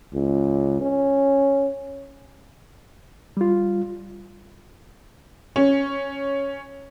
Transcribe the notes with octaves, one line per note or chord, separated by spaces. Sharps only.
C#2
C#4
G3 F4
C#4